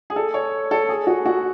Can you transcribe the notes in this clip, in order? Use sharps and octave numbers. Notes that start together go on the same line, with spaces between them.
G#4
A4
C#5
A4
G#4
F#4
F#4